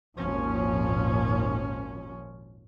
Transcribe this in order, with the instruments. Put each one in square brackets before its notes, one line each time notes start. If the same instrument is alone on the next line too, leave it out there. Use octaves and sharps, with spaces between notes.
[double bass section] G#1 D#2 A#2 F3 C#4